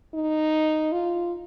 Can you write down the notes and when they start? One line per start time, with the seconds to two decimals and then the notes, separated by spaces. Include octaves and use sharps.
0.14 D#4
0.92 F4